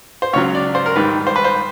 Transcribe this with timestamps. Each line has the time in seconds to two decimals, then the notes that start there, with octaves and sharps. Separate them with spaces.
0.22 C5
0.33 C#2 C#3 F#3 C#5
0.55 D5
0.75 C5
0.86 A#4
0.96 G#2 D#3 G3 B4
1.27 C5
1.36 B4
1.44 C5